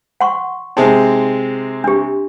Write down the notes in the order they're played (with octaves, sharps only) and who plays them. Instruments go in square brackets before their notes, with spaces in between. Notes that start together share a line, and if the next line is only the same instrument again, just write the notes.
[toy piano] F#5 C6 C#6
[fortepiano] C3 G#3 C4 [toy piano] D#4
[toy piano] D4 G4